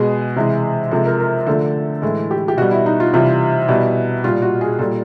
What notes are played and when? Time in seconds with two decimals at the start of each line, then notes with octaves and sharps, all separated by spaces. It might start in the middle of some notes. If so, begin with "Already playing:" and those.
Already playing: B2 G#3 G#4
0.36 C3 E3 G#3
0.91 C3 F3 G#3 A4
1.06 A#4
1.20 A#4
1.47 D3 F3 A3 A4
2.02 A2 E3 G#3 A4
2.31 G4
2.48 G4
2.57 B2 G3 F#4
2.71 E4
2.86 D#4
3.00 F4
3.14 C3 E3 G3 F4
3.68 B2 G3 E4
4.24 A#2 G3 F4
4.42 F#4
4.61 G#4
4.79 A#2 G3 A4